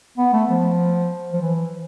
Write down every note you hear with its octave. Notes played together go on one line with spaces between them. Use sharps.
B3
A3
F3
F3
E3